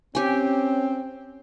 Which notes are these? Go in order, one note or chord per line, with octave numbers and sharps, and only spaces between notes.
C4 C#4 G4 G#5